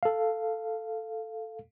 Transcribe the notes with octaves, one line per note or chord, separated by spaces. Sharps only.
A4 F5